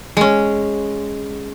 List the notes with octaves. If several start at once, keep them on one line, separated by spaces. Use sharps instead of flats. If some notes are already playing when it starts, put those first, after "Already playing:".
G#3 C#4